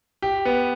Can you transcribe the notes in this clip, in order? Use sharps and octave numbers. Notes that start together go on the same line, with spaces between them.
G4
B3